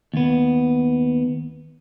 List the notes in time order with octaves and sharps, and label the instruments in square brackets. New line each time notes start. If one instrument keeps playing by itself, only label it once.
[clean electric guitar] D#2 B3